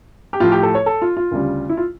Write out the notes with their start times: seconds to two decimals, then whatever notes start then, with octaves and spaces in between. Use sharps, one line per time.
0.33 G4
0.40 A2 F3 F4
0.52 G4
0.63 A4
0.75 C#5
0.86 A4
1.02 F4
1.17 F4
1.31 D2 C#3 G3
1.69 E4
1.77 F4